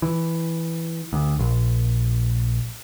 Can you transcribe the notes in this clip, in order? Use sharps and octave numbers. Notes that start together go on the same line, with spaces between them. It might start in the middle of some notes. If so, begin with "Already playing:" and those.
E3
D2
A#1